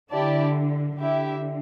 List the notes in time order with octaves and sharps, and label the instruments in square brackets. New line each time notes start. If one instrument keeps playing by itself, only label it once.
[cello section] D3 [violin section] E4 G4 D5 A5
[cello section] D3 [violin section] E4 G4 E5